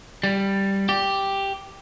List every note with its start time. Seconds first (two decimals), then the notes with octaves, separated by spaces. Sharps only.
0.23 G3
0.89 G4